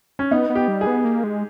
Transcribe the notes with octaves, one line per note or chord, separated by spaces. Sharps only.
C#4
B3 D#4
B3
G4
G3
G#4
B3
A#3
G#3